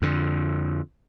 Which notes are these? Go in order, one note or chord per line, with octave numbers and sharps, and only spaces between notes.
F2 D3